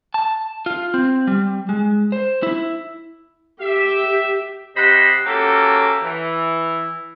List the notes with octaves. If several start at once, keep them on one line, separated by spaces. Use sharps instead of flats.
A5
F4
C4
G3
G#3
C5
E4
G4 E5
C3 G4 C5 D#5 F#5 B5
A#3 C#4 F#4 G4 A4
E3